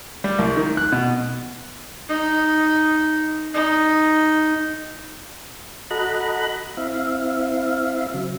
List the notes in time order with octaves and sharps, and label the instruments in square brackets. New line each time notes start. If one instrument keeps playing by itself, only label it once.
[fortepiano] G3
C2
D#3
F#6
B2
[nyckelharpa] D#4
D#4
[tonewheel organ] F#4 A4 D#5 A#5 B5 F#6
C4 E4 E5 F5
C#3 F#3